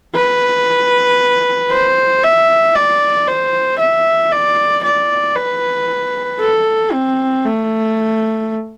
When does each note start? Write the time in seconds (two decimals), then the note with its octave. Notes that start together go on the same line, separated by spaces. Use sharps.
0.15 B4
1.71 C5
2.24 E5
2.75 D5
3.28 C5
3.79 E5
4.32 D5
4.84 D5
5.36 B4
6.40 A4
6.92 C4
7.45 A3